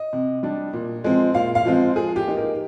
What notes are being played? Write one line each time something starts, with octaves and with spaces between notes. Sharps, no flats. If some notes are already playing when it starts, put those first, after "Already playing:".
Already playing: D#5
C3
G3 D4
A#2
F3 G#3 C4
A#2 F5
F5
F3 G#3 C4
F3 G#4
G4
A#3 D#4
A#4